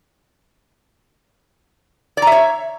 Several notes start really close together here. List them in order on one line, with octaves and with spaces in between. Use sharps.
D5 A#5 E5 C#5